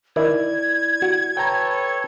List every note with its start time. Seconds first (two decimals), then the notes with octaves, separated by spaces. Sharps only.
0.16 D#3 E4 D5 G#6
1.02 F#4
1.37 A4 B4 C#5 G5 A#5